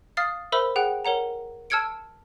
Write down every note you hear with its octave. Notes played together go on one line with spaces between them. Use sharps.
F5 D#6 F6 A6 C7
A#4 C5 E5 B5 E6
G#4 F#5 G5 F#6
A#4 C#5 F#5 A#5
A5 E6 F6 G#6 C#7 D7